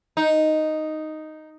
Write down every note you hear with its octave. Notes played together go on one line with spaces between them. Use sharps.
D#4